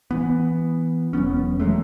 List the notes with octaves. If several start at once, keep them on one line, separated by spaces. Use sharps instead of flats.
E3 B3
E1 F#3 B3 C#4
E3 F#3 G#3 A3